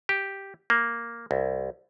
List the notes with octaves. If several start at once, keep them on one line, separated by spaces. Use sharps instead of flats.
G4
A#3
C2